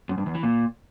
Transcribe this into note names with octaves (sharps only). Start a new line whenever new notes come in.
F#2
G2
E2
E3
A#2